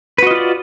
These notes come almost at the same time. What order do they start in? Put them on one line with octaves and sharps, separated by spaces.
B4 F#4 D#5 F4 D5